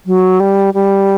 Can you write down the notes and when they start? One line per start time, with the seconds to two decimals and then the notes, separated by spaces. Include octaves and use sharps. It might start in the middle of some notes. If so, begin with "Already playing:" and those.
0.06 F#3
0.40 G3
0.74 G3